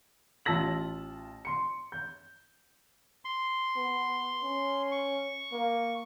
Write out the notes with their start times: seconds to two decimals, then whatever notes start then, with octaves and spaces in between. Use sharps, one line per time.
0.45 A1 F4 A5 E6 A#6 F#7
1.45 C6 C#7
1.92 G6
3.25 C6
3.76 B3
4.43 C#4
4.92 C#6
5.52 A#3